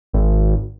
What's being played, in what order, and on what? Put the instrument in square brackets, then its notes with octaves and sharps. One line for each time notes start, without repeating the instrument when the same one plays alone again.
[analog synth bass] G#1